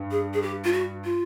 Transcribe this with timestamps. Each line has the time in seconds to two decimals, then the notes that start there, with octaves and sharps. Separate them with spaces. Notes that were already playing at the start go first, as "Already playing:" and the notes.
Already playing: G2
0.11 G#4
0.34 G#4
0.42 G4
0.64 F4
0.72 F#4
1.05 F4